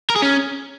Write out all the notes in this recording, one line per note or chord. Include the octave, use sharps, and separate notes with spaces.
A#4
G#4
C#4